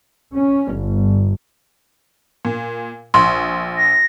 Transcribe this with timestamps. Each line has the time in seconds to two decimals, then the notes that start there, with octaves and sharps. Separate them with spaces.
0.36 C#4
0.74 G1
2.45 A#2
3.14 A#1 C6
3.78 A#6